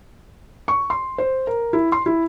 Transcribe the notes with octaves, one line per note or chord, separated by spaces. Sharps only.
C#6
C6
C5
A#4
E4
C6
E4